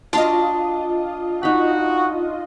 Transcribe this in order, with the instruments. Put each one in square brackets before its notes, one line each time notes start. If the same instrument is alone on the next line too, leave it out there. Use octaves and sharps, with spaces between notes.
[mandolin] D4 [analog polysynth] F4 D#5 [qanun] F#4 A#5 C6
[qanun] D#4 B5 [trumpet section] F#4